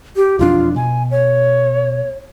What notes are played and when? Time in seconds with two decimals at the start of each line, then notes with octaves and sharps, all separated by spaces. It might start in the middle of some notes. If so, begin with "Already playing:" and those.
0.16 G4
0.39 E1 F2 D4 F4
0.76 B2 G#5
1.11 C#5